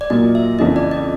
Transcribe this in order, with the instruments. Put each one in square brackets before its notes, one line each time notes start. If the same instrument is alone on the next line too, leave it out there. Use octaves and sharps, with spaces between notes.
[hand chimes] D5
[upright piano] A#2 F#3 A#3 [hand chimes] D#5
[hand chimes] E5
[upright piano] F2 C#3 E3 [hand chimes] D#5
[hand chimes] D5
D#5